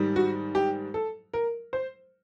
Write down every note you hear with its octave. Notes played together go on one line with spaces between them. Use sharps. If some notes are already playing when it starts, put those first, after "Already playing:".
Already playing: G#2 D#3 G3
F#4
G4
A4
A#4
C5